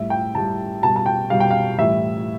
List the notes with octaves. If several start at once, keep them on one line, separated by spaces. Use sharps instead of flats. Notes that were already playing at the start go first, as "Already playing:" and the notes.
Already playing: A2 G3 E5
G5
A2 G3 A5
B2 G3 A5
A5
G5
B2 G3 F5
G5
F5
A2 E3 G3 E5